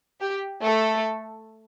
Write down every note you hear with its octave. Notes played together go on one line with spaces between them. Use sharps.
G4
A3 A4